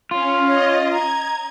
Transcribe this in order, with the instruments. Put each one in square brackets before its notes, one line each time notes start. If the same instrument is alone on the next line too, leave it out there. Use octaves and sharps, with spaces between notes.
[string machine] C#4 [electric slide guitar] F4
[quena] C#5 [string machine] D#5
[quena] A#5 [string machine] G#6